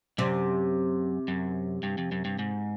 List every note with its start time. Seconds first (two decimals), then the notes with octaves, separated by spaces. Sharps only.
0.18 F#2 C3
1.28 F#2
1.83 G2
1.98 F2
2.12 F#2
2.25 G2
2.39 G#2